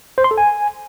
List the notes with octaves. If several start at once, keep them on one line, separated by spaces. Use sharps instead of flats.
C5
C6
A4
G#5